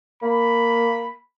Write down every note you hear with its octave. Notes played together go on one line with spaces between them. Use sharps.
A#3 B5